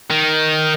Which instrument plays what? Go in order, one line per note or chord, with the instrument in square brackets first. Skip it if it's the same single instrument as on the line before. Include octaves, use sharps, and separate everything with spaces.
[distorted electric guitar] D#3